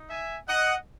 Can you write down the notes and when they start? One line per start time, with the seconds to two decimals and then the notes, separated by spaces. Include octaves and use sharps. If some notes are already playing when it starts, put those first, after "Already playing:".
Already playing: D#4
0.10 E5 G#5
0.48 D#5 F#5